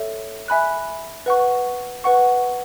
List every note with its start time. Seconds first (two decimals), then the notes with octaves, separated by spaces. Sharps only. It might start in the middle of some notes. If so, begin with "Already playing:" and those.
Already playing: A4 C#5 E5
0.48 E5 G#5 B5 F#6
1.26 B4 F#5 C#6
2.04 B4 F#5 C#6